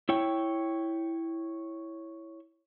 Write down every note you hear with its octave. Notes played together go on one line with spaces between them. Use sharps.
E4 C#5 G5